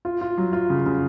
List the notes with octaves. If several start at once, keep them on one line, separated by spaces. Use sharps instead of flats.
F4
F4
F#3
F4
C#3
C#3